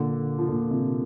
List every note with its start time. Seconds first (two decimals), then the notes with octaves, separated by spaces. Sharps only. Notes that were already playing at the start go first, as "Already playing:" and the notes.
Already playing: A#2 D3
0.39 F3
0.48 A#2 D3
0.71 C3 F3